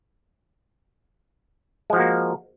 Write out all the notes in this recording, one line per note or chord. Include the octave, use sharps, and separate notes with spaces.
F3 G#3 A#3 F#4